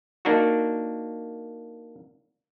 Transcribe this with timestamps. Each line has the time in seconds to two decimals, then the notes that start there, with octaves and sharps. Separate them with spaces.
0.25 A#3 D4 D#4 F#4